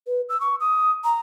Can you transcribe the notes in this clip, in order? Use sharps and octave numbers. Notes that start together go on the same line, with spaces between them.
B4
E6
C#6
D#6
A#5